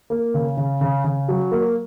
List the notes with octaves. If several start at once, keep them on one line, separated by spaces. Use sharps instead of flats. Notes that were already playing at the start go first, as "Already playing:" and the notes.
A#3
C#3
C#3
C#3
C#3
F#3
A#3